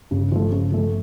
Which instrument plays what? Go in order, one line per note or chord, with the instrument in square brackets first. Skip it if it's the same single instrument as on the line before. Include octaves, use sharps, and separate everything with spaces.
[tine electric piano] G1 G2 [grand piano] C#3
[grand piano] F3 A3
C#3
F3 A3